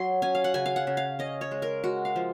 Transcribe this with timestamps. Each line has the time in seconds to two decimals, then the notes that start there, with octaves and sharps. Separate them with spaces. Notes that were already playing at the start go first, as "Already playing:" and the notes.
Already playing: F#3 C6
0.22 C#4 G#5
0.35 F5
0.44 F#5
0.54 C#3 G#5
0.66 F5
0.76 F#5
0.87 C#3
0.97 F5
1.19 C#4 D#5
1.41 C#5
1.51 G#3
1.62 A#4
1.84 G#3 F#4
2.05 F5
2.16 F3